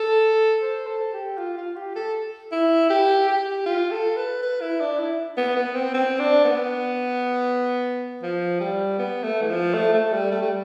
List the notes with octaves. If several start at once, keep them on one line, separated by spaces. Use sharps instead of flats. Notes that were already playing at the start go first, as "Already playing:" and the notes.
Already playing: A4
C5
A4
G4
F4
F4
G4
A4
E4
G4
G4
F4
A4
B4
B4
E4
D4
E4
B3
B3
C4
C4
D4
B3
F3
G3
B3
A3
E3
F3
A3
A3
G3
A3
G3